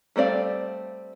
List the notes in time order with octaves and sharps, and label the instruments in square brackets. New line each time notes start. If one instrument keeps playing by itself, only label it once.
[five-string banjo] G3 A3 C4 D5 F5